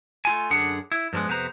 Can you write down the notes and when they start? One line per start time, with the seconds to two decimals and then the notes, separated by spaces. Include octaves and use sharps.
0.25 A3 F4 G#5
0.50 F#2 D3 D4 G#4 F#5
0.92 E4
1.13 G2 F3 F#3 G#3 B3
1.29 F2 C3 B3 B4 C5 A#5